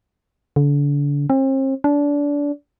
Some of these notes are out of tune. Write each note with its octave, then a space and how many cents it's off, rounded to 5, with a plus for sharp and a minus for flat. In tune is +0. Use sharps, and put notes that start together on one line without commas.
D3 -35
C4 +40
D4 -25